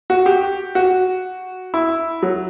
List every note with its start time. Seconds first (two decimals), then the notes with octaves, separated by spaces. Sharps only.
0.10 F#4
0.26 G4
0.75 F#4
1.74 E4
2.22 F#3